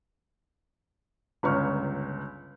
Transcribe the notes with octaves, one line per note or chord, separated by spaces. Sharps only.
G1 C#2 C#4 C#6 F6